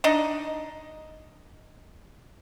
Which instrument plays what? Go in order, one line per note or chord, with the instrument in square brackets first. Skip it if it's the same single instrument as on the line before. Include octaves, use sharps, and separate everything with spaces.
[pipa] D4 D#4 D#5